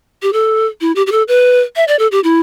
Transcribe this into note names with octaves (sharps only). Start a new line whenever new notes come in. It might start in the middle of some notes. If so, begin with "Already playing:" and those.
G4
A4
E4
G4
G4
A4
B4
E5
D5
A4
G4
E4